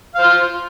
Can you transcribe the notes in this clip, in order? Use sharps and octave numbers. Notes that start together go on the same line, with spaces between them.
C5 F5 C6